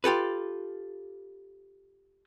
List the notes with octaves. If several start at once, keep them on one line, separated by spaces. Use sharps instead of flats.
F4 G4 A4 B4